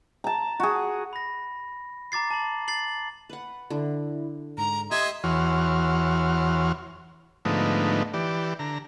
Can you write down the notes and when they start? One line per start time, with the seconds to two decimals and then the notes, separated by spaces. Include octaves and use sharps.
0.24 A5 A#5
0.60 F#4 G#4
1.13 B5 A#6
2.12 A#5 D6 A6 C7
2.31 A5 F#7
2.68 A6 C7 F#7
3.30 B4 F#5
3.70 D3 E4
4.57 G#2 A#5
4.91 G4 D#5 E5 C6 D#6 G#6
5.24 E2 E3 F#4 C#5 C6 F6
7.45 G#2 D3 F3 A3 B3 D#4
8.13 E3 G4 D5
8.59 D3 A#5